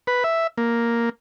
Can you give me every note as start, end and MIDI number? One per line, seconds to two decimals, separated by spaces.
0.07 0.24 71
0.24 0.47 76
0.58 1.09 58